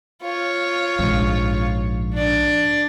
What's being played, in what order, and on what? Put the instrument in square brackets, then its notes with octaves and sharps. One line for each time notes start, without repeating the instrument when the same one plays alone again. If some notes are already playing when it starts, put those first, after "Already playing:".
[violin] F4 C#5
[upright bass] A#1 G#2
[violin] D4 D5